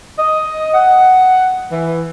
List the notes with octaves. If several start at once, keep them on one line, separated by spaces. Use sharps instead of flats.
D#5
F#5
E3